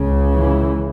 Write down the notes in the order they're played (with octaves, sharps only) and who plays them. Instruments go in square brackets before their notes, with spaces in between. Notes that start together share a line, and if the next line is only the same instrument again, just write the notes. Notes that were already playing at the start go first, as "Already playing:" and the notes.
Already playing: [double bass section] C#2 C#3
E3